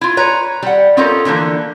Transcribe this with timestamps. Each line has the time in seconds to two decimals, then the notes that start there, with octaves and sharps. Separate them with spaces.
0.01 E4 F4
0.17 B4 C#5 A#5
0.63 G3 F#5
0.97 C#4 D#4 F4 G4 A4 A#4
1.25 D3 E3 F3 A#3